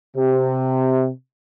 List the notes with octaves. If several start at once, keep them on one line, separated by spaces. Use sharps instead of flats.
C3